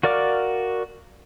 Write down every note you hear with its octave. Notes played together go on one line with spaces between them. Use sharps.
F#4 A#4 D5 F5 D6